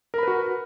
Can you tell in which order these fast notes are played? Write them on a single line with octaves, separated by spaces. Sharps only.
A#4 B5 B4 F#4